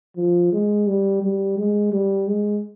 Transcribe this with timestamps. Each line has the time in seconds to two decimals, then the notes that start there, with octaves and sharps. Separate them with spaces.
0.17 F3
0.52 G#3
0.87 G3
1.23 G3
1.58 G#3
1.92 G3
2.27 G#3